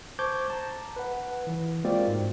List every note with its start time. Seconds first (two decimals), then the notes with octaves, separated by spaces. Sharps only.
0.19 C5 A5 C#6 D6 G6 G#6
0.50 A5 A#5
0.96 B4 F#5
1.47 E3
1.84 G#3 A#3 C4 F4 F#4 D5
2.07 G#2